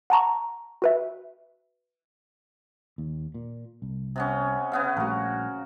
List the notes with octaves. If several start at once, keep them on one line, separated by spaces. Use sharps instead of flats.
F#5 A5 A#5 C#6
F#4 B4 E5
D#2
A#2
C2
C3 B3 C#4
C#3 B3 F5
A#1 G3 A3 F#4 A#4